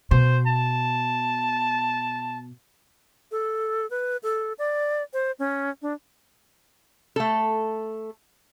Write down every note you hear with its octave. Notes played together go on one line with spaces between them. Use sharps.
B2 C5
A5
A4
B4
A4
D5
C5
C#4
D4
A3 A4